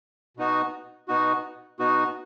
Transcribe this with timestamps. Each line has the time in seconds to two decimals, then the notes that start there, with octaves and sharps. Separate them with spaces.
0.37 B2 B3 D#4 F#4
1.08 B2 B3 D#4 F#4
1.79 B2 B3 D#4 F#4